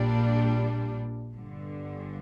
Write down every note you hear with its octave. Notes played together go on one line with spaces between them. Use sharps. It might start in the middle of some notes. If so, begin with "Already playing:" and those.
Already playing: A#1 A#2 G3 D4
G1 G2 D3